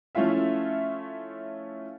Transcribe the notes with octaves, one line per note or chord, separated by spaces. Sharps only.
F3 A3 C#4 E4 F4 E5